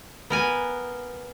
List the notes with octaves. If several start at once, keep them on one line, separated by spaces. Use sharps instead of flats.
B3 A#4 G#5